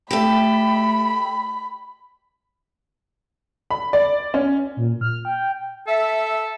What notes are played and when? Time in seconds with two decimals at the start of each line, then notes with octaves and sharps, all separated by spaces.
0.11 A3 G4 A4 B5
3.70 B5
3.93 D5
4.34 C#4
4.77 A#2
5.01 F6
5.25 G5
5.87 A4 E5